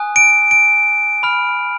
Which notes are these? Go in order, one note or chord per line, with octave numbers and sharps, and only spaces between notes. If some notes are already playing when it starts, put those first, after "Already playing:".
Already playing: G#5 D#6 F#6
D7
D7
B5 F6